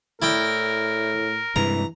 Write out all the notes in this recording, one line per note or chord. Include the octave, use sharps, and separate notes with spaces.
A2 E4 A#4 D5 G5
G2 C3 E3 G#3 A#5